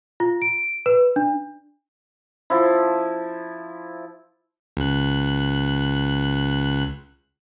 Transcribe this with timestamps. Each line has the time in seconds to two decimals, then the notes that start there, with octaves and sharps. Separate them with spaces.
0.20 F4
0.42 D7
0.86 B4
1.16 D4
2.50 F3 E4
4.77 C#2 F#6